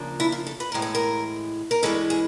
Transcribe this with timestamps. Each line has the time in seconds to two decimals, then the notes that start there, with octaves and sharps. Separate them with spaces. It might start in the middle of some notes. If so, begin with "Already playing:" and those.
Already playing: C#3 F3 A#3 D4
0.20 E4
0.32 F4
0.47 A4
0.60 B4
0.72 A2 E3 G#3 A#4
0.82 A4
0.95 A#4
1.71 A#4
1.83 G2 E3 G#3 A4
2.10 G#4